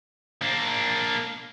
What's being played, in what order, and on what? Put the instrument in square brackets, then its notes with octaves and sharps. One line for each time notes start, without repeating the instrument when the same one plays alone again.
[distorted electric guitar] A#3 D4